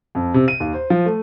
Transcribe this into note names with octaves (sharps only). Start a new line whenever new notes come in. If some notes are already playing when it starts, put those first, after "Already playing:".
F2
C3
D#7
D#2
C5
F3
A3